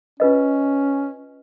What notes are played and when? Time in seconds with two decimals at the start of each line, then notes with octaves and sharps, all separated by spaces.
0.20 C#4 F4 B4 D#5